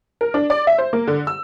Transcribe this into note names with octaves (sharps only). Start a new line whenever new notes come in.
A#4
D4
D5
E5
C5
A#3
D3
E6